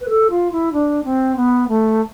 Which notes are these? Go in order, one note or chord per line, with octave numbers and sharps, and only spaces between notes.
B4
A4
F4
E4
D4
C4
B3
A3